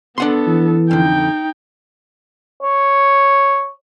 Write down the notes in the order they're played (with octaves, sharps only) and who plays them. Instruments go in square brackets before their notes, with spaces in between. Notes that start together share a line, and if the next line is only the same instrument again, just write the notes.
[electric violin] B3 A4 [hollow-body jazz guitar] D4 F#5 C6
[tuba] E3
[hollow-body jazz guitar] F2 D3 [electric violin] D#4 G5
[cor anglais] C#5